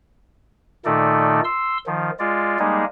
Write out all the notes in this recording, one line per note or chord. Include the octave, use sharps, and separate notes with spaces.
A#2 D#3 A3 D#4 A4 D5
C6 E6
D#3 F3
G#3 F4 D5
G3 G#3 A#3 D#4 G#4